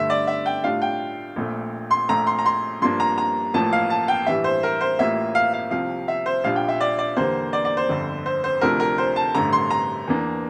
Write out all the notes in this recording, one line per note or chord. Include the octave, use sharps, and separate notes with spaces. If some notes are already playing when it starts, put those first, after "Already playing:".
Already playing: G2 D3 A3 E5
D5
E5
G5
A2 G3 D4 F4 F5
G5
A#1 A#2 A3
C6
A#1 A#2 A3 A#5
C6
A#5
C6
G2 F3 A#3 D4 C6
A#5
A#5
A1 A2 F3 A#3 A5
F5
A5
G5
A1 G2 E3 G3 E5
C5
A#4
C5
A1 A2 G3 A#3 F4 E5
F5
F5
C2 C3 F3 F5
E5
C5
A#1 A#2 G3 D4 F4 F5
G5
E5
D5
D5
E2 D3 G3 A#3 C5
D5
D5
C5
G1 F2 D3
C5
C5
D2 C3 F3 A3 D4 A#4
A#4
C5
A5
A1 G2 D3 A3 A#5
C6
A#5
E2 E3 A#3 D4